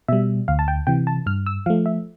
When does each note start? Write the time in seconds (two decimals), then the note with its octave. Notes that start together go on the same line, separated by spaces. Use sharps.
0.08 B2 G3 E5
0.48 D2 F5
0.59 A5
0.68 G5
0.87 C3 E3 G5
1.07 A5
1.26 G2 F6
1.46 E6
1.66 F3 A3 F5
1.86 E5